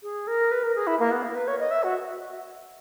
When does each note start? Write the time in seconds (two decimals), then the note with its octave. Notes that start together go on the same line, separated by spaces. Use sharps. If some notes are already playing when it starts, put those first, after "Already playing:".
0.03 G#4
0.27 A#4
0.51 B4
0.63 A#4
0.75 G#4
0.87 E4
0.99 A#3
1.11 B3
1.23 A#4
1.35 B4
1.48 C#5
1.59 D#5
1.71 E5
1.83 F#4